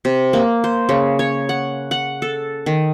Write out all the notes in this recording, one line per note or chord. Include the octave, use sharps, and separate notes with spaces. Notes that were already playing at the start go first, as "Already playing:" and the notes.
C3
A#3
C5
C#3
C#5
F#5
F#5
A4
D#3